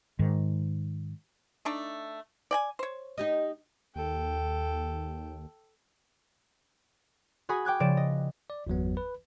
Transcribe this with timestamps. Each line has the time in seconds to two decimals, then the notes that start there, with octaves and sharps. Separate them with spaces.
0.19 G#2 D#3
1.65 A3 D4 D#4
2.51 D5 G5 G#5
2.79 C5 C#5
3.18 D#4 G4 D#5
3.96 D#2 A4 G5
7.49 F#4 G#4 G#5 B5 D#6
7.65 G5 D6 F#6 G#6
7.80 C#3 F3 D5 D7 E7
7.97 D#5
8.50 D5
8.67 G1 E2 F#3 B3
8.97 B4